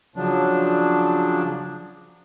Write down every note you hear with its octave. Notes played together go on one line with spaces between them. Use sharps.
C#3 F3 F#3 D4